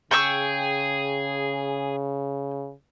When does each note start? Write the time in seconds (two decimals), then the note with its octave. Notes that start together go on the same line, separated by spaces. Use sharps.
0.11 C#3 G#4 G5 C#6 E6